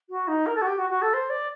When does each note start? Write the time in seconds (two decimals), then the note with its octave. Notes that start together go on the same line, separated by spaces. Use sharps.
0.09 F#4
0.27 D#4
0.46 A#4
0.55 A4
0.61 F#4
0.67 G4
0.78 F#4
0.90 F#4
1.01 A4
1.13 C5
1.29 D5